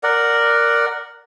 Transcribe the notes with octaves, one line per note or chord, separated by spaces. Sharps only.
A#4 D5 F#5